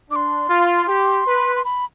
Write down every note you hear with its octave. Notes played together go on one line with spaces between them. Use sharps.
D4 D6
C6
F4
G4
B4
C6
B5